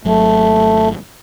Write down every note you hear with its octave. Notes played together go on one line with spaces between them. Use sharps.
G#1 F#3 A3